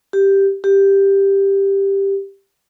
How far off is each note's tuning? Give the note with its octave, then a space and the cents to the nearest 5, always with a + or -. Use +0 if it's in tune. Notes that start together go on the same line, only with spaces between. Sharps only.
G4 +0
G4 +5